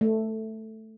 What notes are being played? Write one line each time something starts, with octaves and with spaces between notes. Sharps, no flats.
A3